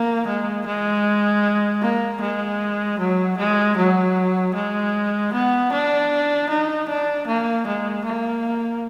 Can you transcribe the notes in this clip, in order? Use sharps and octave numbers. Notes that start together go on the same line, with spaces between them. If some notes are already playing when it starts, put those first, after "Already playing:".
Already playing: A#3
G#3
G#3
A#3
G#3
F#3
G#3
F#3
G#3
B3
D4
D#4
D4
A#3
G#3
A#3